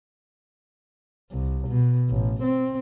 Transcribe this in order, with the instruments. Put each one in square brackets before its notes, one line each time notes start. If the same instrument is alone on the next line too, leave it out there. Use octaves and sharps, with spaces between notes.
[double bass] C2
B2
A1
C4